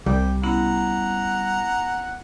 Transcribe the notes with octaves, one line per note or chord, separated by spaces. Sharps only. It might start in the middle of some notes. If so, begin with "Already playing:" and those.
C2 G3 G5 D6
B3 C#4 E4 F#5 A#5